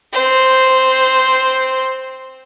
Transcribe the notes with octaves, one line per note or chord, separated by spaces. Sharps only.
C4 C5